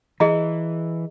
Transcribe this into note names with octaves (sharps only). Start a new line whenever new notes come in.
E3 G#4 D#5 A#5